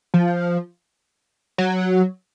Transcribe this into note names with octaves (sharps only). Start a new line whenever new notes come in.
F3
F#3